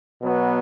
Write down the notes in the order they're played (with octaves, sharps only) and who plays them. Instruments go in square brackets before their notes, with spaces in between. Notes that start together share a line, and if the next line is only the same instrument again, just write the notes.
[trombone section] B2 F#3 B3